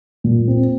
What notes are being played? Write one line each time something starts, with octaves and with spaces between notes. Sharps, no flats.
A#2
C4